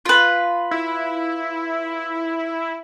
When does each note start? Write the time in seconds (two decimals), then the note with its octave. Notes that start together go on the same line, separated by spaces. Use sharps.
0.06 F4 B4
0.71 E4